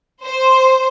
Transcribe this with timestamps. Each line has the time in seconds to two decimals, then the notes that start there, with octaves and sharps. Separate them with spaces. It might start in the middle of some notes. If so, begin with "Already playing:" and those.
0.24 C5